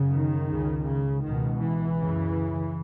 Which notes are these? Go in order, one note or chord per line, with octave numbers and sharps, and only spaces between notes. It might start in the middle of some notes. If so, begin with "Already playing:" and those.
Already playing: F#2 C#3
D#3
C#2 C#3
C#3
C#2 B2 D#3
E3
F#2 C#3